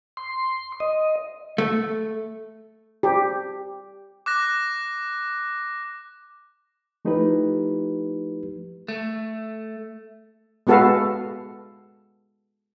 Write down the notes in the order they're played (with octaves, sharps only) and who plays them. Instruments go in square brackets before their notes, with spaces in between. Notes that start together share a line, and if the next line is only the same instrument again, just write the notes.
[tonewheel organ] C6
D#5
[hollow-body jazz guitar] A3
[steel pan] G4
[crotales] D6 F#6 A#6
[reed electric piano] F3 A3 D#4 E4 G4 B4
[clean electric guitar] A3
[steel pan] G#3 B3 F#4 A4 B4 F5